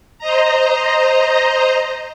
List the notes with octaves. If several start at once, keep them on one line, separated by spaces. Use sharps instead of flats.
C5 D#5 A#5